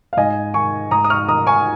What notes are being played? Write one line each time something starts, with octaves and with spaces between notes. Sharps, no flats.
F5
G#2 D#5 G#5
D#3 G#5 C#6
G#2 A#5 D#6
D#6
C#6 F6
D#3 A#5 D#6
G#5 C#6